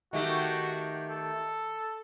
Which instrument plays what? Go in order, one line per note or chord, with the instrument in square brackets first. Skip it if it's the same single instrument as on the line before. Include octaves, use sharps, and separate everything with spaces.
[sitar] D#3 A3 G4 [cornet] F#4
[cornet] A4